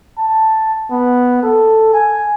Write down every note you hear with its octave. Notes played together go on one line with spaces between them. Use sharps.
A5
B3
A4
G#5